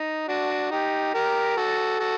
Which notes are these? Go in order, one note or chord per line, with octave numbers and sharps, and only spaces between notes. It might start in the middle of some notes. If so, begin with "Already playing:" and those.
Already playing: D#4
D4 F#4
D#4 G4
G4 A#4
F#4 A4
F#4 A4